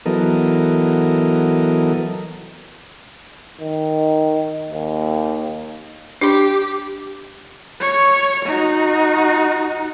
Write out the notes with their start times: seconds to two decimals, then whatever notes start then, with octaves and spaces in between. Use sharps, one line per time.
0.06 E3 F#3 B3 A4 A#4 D#5
3.61 D#3
4.71 D#2
6.21 D4 G4 C6
7.80 C#5
8.45 D#4 F#4